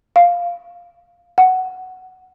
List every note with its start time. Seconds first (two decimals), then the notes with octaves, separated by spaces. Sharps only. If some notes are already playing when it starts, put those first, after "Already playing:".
0.16 F5
1.38 F#5